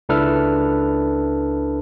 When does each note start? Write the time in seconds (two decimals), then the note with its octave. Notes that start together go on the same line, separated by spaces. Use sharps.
0.09 C#2 D4 E4 A4 B4 F6